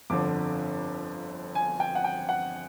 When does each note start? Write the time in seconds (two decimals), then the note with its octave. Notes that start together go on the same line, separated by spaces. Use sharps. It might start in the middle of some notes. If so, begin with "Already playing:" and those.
0.10 G1 F2 D3 D6
1.55 G#5
1.80 G5
1.95 F#5
2.04 G5
2.29 F#5